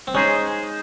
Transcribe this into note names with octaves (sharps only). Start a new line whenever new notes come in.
C4
G#3 C#4 D#4 G#4 C5